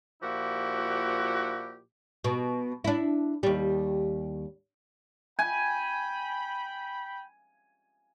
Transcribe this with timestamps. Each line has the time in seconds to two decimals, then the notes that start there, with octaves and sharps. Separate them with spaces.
0.22 A#2 F3 A#3 E4 F#4 G4
2.24 B2
2.84 D4 E4
3.43 D#2 G3
5.39 G5 G#5 B5